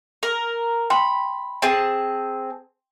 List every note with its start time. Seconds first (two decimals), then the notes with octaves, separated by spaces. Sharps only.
0.23 A#4
0.90 G5 B5 C6
1.62 C4 G#4 A5